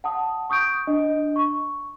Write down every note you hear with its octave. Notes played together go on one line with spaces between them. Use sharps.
F#5 A5 D#6
C#6 D#6 G6 D7
D4 D#5
C#6